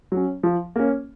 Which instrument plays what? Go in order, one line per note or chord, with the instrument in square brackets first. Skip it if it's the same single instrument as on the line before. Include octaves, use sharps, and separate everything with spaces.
[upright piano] F#3 C#4
F3
A#3 C#4